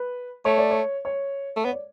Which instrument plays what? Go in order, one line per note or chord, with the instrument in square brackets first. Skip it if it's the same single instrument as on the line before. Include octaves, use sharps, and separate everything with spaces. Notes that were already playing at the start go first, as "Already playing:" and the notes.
Already playing: [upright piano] B4
[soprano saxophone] A3 [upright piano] C#5
[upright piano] D5
C#5
C#5
[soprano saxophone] A3
[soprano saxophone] B3 [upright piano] C#5
[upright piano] D5